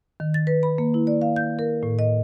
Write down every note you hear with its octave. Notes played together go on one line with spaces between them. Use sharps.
D#3
A6
B4
B5
A#3
E4
D5
F5
G6
A#4
A2
D#5